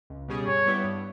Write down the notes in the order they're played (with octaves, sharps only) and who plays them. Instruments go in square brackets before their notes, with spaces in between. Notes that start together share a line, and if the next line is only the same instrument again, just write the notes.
[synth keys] C#2
B2 G3 C#4 G#4
[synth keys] G2 [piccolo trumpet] C#5
[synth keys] G3 B3 E4 G4
G2